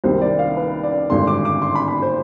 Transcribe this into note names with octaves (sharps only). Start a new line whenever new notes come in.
C2 C3 D#3 C5
D5
F5
B4
D5
G#1 G2 D3 C6
D6
D6
C6
B5
B5
C5